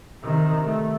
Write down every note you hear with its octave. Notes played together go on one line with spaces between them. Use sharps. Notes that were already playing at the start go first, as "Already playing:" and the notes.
C3 D#3
A3